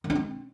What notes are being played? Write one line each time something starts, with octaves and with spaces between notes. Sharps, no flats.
D#3
D#4
C4